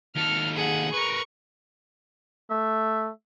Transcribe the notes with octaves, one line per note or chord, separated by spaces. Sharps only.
D#2 A4 F6
G#4 F#5
A#4 B4 C#6
A3 E5